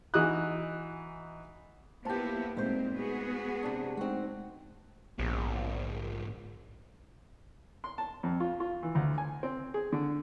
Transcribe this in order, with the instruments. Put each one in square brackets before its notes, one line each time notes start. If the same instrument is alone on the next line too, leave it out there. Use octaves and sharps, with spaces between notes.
[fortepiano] E3 D#4 F#4 G#5 D#6 F#6
[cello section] A#3 B3 E4 [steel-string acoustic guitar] F4 G4 [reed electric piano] C5 A5
[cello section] A#2 C4 [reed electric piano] G#3 A3 [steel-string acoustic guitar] D#4 C5
[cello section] B3 F#4 G#4
[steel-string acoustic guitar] C3 D4
[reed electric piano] G#3 A3 D#4 [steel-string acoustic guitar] C4 F#4
[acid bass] A#1 [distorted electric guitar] G#2 B3
[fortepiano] C6
A5
F2
F4
F4
E3
D2
G#5
C4
G#4
D3